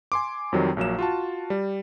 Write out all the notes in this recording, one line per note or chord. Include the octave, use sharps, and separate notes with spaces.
G#5 C6 D6
F2 D#3 F#3 G3 C4
A#1 F#3 A#3 E7
F4 F#4 A5
G3